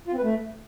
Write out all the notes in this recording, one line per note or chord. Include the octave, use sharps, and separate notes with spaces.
F4
C4
B4
A3